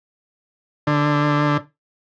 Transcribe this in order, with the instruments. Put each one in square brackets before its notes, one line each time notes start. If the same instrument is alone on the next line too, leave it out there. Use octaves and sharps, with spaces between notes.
[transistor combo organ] D3